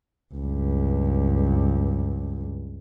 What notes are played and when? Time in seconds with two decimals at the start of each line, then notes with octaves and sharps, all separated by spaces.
0.35 C#2 G2